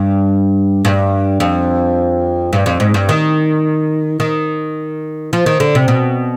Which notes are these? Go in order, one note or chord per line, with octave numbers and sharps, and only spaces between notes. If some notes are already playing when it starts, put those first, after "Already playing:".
Already playing: G2
G2
F2
G2
F2
G#2
G2
D#3
D#3
F3
D#3
D3
C3
B2